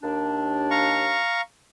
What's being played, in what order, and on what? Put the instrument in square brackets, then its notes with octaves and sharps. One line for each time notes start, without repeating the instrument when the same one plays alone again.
[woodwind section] D#2 D4
[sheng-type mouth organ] F5 A#5 C#6